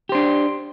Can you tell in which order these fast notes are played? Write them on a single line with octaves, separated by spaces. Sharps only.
G4 C5 D4